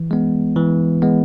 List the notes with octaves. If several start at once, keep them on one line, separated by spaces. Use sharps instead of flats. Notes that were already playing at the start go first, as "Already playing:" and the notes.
Already playing: E3
G#3 B3
E3
G#3 B3